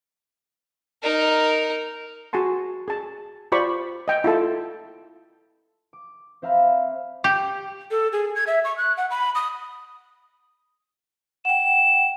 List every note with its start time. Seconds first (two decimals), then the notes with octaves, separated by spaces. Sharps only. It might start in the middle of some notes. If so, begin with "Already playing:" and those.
1.02 D#4 A#4
2.33 F#4 G#4 G#5 A5 C6
2.88 G#4 A5
3.52 F4 G4 C5 D5 B5 C#6
4.08 D#5 G5
4.24 E4 F4 A4 A5
5.93 D6
6.42 C4 C5 E5 F5 A#5 B5
7.24 G4
7.91 A4
8.12 G#4
8.36 G#6
8.47 E5
8.64 C#6
8.77 F#6
8.97 F#5
9.10 B5
9.35 D#6
11.45 F#5 G5 E7